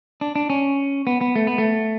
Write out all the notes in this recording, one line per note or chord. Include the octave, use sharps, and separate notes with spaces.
D4
D4
C#4
B3
B3
A3
B3
A3